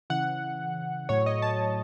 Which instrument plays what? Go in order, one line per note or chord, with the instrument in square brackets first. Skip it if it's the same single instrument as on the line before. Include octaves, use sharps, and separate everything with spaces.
[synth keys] C#3 E3 F#5
A2 F#3 C#5
D#5
A5